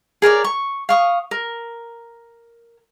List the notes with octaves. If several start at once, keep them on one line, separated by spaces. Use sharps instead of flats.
G#4 A#4 C#5 D5
C#6
F5 C#6 D#6
A#4